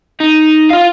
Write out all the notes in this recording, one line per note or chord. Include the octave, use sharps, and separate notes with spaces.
D#4
F4 F5